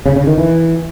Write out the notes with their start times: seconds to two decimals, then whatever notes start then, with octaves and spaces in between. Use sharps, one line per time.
0.06 C#3
0.16 C#3
0.27 D#3
0.38 E3